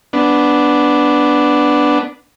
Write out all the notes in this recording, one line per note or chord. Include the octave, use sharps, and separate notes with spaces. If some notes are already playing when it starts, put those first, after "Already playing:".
B3 D4